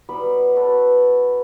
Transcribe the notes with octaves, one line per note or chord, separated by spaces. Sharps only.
F#3 G3 B3 B5
F#4 A4 B4